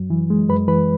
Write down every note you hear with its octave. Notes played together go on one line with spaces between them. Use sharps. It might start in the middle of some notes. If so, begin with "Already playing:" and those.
Already playing: F#2 F#3
E3
G#3
F#2 B4 B5
E3 B4 B5